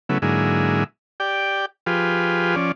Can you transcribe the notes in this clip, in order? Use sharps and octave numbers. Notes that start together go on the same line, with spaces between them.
C#3 F#3 A3 B3 E4
G#2 D3 F#3 A#3 E4 G#4
G4 D5 G5
F3 F4 G4 G#4 B4
F3 C#4 D5